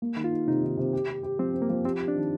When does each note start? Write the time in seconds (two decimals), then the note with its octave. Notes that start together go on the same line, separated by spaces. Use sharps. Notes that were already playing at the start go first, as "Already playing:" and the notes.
0.02 A#3
0.16 D#3
0.24 F4
0.32 D#4
0.47 C3 D#4
0.63 D#3
0.78 C3
0.93 G4
1.08 G4
1.23 G4
1.39 F3 C4
1.54 C4
1.62 A#3
1.69 F3
1.84 C4 G4
2.00 G4
2.08 D4
2.15 D#3